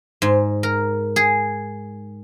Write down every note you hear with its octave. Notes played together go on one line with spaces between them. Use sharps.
G#2
A#4
G#4